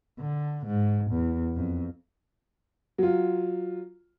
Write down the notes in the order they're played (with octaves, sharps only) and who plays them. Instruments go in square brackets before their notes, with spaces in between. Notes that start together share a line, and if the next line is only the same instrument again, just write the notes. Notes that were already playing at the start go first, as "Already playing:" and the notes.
[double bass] D3
G#2
E2
F2
[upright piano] F#3 F4